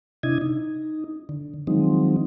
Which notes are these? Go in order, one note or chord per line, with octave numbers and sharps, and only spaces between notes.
C3 D4 E4 D#5 G#6
D#4
D3
D#3 F3 F#3 G#3 C4 D#4